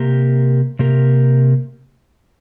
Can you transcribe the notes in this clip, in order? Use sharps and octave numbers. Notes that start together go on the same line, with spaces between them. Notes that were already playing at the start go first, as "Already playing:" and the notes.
Already playing: C3 A#3 G4 A#4
C3 A#3 G4 A#4